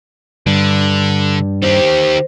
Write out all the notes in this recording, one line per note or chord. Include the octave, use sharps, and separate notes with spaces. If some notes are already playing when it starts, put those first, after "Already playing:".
G2 D3
D#3 G4 C5